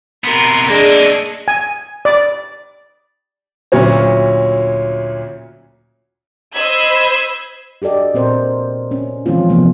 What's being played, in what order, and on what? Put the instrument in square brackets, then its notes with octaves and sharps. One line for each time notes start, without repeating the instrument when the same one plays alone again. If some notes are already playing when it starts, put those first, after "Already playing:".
[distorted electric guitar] C3 B3 [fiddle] A#4 C6
[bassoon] G#3 [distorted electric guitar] A#3 A4 [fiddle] D4 G#4
[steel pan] G#5
D5
[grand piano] D2 A#2 F#3 C#4 C#5
[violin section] C5 D#5 B5 E6 G#6
[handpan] F#4 G4 A4 D5 D#5
A#2 C4 A#4 C5
C#4
E3 F3 G#3 C4 C#4 F4
C3 E3 F3 A3 B3